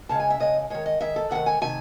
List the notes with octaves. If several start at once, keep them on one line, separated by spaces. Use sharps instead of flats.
C#3 G#3 A5
G#5
E5
C#3 G#3 D#5
D#3 G#3 C#5
D#5
D#3 G#3 E5
A4
C3 D#3 A3 F#5
G#5
C3 D#3 A3 G#5